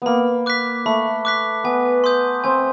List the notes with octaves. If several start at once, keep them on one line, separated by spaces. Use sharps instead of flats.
A#3 B3 B5
D6 F#6 B6
A3 B5
D6 F#6 B6
B3 G#5
C6 D#6 G6
C4 G#5